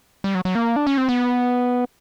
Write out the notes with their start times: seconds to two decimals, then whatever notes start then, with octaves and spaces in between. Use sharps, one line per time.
0.24 G3
0.35 F#3
0.45 F#3
0.55 A#3
0.76 D4
0.87 C#4
0.98 C4
1.09 B3